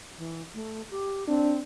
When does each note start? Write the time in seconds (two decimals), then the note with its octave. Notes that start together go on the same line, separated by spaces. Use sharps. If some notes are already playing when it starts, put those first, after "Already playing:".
0.18 E3
0.54 A3
0.91 G4
1.28 C4 D4